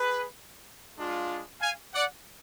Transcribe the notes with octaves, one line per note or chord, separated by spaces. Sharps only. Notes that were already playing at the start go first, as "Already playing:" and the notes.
Already playing: G#4 B4
G#3 D4 F4
F5 G#5
D5 F#5